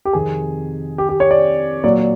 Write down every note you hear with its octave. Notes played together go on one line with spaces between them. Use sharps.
G4
F2 C3 D#3 G#4
G4
G4
C#5
D5
A#2 F#3 D5